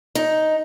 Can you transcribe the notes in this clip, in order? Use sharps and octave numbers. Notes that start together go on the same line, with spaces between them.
D#4